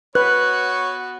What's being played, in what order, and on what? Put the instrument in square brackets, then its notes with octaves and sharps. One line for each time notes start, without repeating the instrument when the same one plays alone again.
[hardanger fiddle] B3 F#4 [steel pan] B4 [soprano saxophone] C#5 [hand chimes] F#6